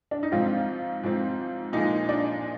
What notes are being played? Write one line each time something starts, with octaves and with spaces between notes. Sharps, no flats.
D4
D#4
G#2 F3 C4 F4
G#2 F3 C4
A#2 F3 G#3 D#4
D4